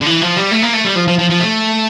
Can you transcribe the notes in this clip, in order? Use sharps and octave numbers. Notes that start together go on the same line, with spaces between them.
D3
E3
F3
G3
A3
A#3
A3
G3
F3
F3
F3
F3
A3